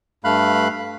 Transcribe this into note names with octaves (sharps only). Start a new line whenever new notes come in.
G2 A3 F5 B5 F#6